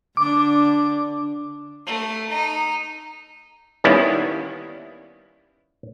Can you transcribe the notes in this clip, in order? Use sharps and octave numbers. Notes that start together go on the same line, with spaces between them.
D3 D4 D6
A3
D#4
D#3 G3 A#3 B3 C#4 E4